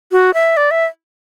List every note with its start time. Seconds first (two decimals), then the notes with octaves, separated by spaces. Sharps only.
0.12 F#4
0.34 E5
0.57 D5
0.71 E5